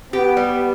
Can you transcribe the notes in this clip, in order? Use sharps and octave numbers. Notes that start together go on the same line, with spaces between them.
B3 G4
G3